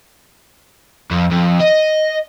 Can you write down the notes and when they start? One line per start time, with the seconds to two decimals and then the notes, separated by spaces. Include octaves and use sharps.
1.11 F2
1.31 F2
1.61 D#5